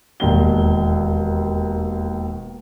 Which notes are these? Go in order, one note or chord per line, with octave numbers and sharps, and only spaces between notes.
E1 D#2 G7